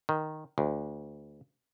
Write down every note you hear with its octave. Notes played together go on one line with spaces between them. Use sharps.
D#3
D2